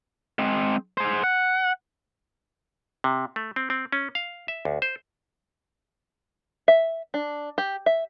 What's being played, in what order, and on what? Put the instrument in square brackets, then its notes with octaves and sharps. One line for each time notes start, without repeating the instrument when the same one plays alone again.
[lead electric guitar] G#3 C4
G#4 C5
F#5
[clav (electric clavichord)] C3
A3
C4
C4
C#4
F5
E5
D2
C5
[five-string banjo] E5
D4
G4
E5